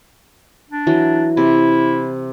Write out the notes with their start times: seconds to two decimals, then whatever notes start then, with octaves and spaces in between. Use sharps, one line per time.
0.70 D4
0.87 E3 F#3
1.37 C3 E4